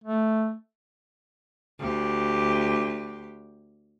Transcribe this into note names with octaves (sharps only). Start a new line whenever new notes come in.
A3
D2 G4